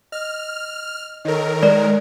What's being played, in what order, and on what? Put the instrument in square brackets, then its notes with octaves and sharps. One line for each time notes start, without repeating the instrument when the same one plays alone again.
[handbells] D#5 [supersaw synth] F6
[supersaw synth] D#3 A#4 [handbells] A4 C#5 D#5
[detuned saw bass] G#3 [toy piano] D5 A#5